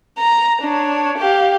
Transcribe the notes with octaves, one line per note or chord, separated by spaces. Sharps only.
A#5
D4 C#5
G4 F5